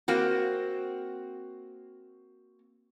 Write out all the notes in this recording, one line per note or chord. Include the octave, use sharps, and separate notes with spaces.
A#3 C4 F#4